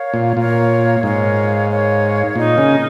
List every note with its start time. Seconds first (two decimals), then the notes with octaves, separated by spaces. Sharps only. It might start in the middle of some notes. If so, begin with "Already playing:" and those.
Already playing: A#4 C#5 F5
0.14 A#2
0.36 A#2 A#4 C#5 F5
1.02 G#2 A#4 C#5 F5
1.69 A#4 C#5 F5
2.35 A#2 D#4 A#4 D#5
2.58 C#3